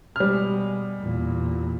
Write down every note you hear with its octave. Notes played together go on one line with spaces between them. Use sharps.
B2 G3 G#3 F6
E2 A#2